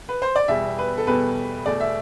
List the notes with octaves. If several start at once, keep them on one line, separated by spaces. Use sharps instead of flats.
B4
C5
D5
E2 B2 G3 E5
B4
A4
E2 B2 G3 B4
E2 B2 A3 D5
E5